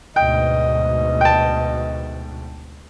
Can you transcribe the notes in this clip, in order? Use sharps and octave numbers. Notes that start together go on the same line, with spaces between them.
D2 G#2 B2 D#5 G5
G5 A5